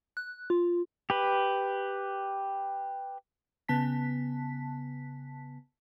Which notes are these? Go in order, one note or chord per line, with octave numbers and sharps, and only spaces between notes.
F#6
F4
G4 B4
C#3 B3 A5 B6